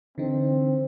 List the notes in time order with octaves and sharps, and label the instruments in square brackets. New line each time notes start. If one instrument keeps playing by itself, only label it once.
[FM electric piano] D3 E3 D#4 [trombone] C4